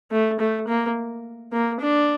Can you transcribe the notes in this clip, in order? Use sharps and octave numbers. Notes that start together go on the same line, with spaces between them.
A3
A3
A#3
A#3
D4